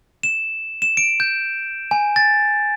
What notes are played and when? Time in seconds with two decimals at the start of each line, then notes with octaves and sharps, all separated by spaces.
0.23 E7
0.82 E7
0.97 D7
1.20 G6
1.91 G#5
2.16 A6